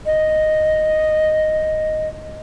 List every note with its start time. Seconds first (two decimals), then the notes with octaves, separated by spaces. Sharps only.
0.06 D#5